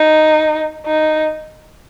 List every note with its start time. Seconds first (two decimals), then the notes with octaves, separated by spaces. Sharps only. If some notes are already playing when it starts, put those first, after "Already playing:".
Already playing: D#4
0.86 D#4